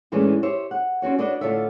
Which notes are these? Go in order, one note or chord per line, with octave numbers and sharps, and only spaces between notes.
A2 E3 G#3 A3 C#4 D4
G4 C5 C#5 E5
F#5
C4 C#4 F#4 C#5
D4 F#4 B4 C#5 D#5
A2 D3 F4 A4 C#5 E5